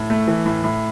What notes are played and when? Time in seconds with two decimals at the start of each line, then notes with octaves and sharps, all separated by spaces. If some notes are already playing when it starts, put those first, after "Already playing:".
Already playing: A2
0.10 A3
0.28 E3
0.46 A2
0.64 A2